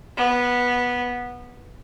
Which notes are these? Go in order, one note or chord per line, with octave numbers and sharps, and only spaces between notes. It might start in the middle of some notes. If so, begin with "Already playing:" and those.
B3